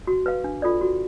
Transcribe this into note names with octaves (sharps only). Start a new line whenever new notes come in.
F#4
B4 F5
D4
F4 A4 D5
F#4